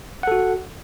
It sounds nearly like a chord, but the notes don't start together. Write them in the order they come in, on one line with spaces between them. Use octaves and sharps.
F#5 A4 F#4